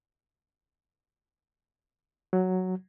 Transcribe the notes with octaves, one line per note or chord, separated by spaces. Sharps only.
F#3